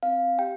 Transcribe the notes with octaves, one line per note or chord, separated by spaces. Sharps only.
C4 F5
G4 G5